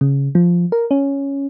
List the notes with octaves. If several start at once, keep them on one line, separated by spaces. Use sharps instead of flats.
C#3
F3
A#4
C#4